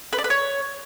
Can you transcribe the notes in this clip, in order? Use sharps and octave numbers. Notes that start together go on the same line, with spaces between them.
B4
D5
B4
C#5